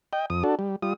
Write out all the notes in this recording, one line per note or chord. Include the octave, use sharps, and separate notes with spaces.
D#5 G5
F2 D#6
D4 F#4 A4
G3
G3 F4 D#6